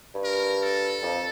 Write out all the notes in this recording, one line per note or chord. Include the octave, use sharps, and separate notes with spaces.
G2
A#4
A4
F2